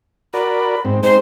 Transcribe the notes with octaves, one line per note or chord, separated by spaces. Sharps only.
F#4 A#4 D5 B5
G#2 C4
G#3 C4 D#4 C5